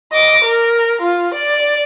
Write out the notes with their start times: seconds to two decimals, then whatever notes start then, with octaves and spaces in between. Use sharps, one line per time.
0.13 D#5 D6
0.45 A#4
1.01 F4
1.34 D5